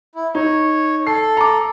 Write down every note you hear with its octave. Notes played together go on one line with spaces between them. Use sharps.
E4
D#4 C#5
A4 C7
A#5 D6